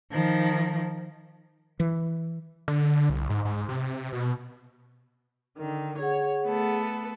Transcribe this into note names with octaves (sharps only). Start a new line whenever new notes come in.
D#3 F3
E3
D3
C2
G#2
G#2
C3
B2
D3 D#3
G#4 C#5 F#5
A3 B3 A4